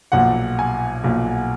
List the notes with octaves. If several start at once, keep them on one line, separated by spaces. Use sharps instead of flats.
B1 A#2 F3 F#5
G#5
B1 A#2 F3